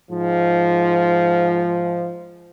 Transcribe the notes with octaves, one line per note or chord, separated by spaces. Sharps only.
G#2 F3